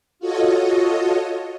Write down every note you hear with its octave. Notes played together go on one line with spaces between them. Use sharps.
F4 F#4 A4 C#5 D#5